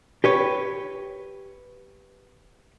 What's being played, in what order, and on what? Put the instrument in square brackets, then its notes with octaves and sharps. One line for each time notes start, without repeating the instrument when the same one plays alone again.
[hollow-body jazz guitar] G4 B4 C#5